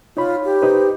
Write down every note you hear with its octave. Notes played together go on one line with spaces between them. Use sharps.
D#4 F4 C#5 B5
G4
D#4 B4 C5